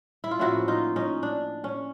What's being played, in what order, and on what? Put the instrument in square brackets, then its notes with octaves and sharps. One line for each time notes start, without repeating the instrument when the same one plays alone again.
[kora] E4
F4
A2 F3 A#3 C#4 E4 F#4
D#4 F4
C#4 D#4
D4
C#4